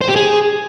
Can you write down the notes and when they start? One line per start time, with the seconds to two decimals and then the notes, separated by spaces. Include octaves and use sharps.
0.01 C5
0.09 G4
0.16 G#4